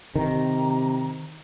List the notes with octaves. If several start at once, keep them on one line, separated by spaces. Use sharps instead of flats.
C3 D#3 A#5